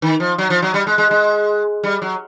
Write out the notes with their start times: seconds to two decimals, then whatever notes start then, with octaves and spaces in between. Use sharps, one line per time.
0.02 D#3
0.20 F3
0.38 F#3
0.50 F3
0.62 F#3
0.74 G3
0.87 G#3
0.98 G#3
1.11 G#3
1.83 G3
2.02 F#3